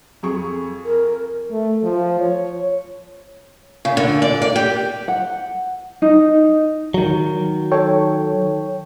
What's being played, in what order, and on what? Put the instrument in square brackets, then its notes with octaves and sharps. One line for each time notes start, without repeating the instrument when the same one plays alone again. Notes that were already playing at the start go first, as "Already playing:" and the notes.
[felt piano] F2 G#4 C#6
[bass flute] A#4
[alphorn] A3
F3
C#5
[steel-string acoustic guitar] C#3
D3
D5
D5
G4
[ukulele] F#5
D#4
[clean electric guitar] D#3 F#3
[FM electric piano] A4 C#5 G5